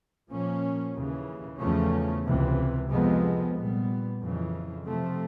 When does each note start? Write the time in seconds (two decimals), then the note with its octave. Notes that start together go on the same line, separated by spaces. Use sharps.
0.29 A#2 F3 A#3 C#4
0.95 D#2 C#3 E3
1.60 E2 C#3 F3 A3 C#4
2.26 C#2 C3 E3
2.90 F2 C3 F3 G#3 B3
3.55 A#2 G3 B3
4.20 F2 C#3 E3
4.86 C3 F3 A3 C4